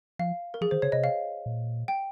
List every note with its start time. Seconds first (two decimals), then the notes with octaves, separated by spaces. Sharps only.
0.19 F3 F5
0.54 A#4
0.61 F3 G#4
0.71 D#3 C5
0.82 C#3 C#5
0.92 C3 D#5
1.04 F5
1.46 A#2
1.88 G5